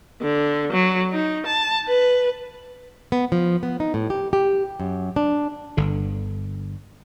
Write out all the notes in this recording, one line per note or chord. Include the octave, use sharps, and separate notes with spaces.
D3
F#3
D#4
A5
B4
B3
F3
B3
D#4
A2
G4
G4
F#2
D4
G1 D3